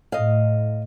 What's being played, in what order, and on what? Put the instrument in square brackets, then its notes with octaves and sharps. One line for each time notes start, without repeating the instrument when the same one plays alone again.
[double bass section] A2 [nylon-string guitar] D#5 F5